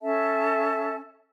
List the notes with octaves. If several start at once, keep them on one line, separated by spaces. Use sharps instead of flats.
C#4 A4 E5 A5